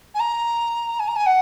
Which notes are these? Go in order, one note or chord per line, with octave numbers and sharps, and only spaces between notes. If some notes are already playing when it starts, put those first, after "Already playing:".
G#5
A#5
G#5
A#5
G#5
F#5